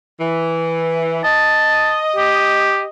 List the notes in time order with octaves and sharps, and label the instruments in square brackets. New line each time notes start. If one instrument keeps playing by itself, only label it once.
[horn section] E3
[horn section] D#5 [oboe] A5
[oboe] G4